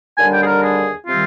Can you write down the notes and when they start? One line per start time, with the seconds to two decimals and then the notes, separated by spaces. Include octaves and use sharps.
0.17 D#2 D3 G3 D4 G#5
0.33 G5
0.42 G#4
0.46 A#4
0.62 G#4
1.06 C3 D#3 G3 C4 F4